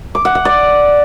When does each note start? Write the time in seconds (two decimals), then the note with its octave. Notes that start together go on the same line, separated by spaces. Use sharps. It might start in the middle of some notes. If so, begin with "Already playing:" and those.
0.15 D6
0.25 F#5
0.35 F#5
0.45 D5